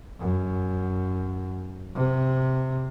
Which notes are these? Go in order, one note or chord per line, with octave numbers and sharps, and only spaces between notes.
F#2
C3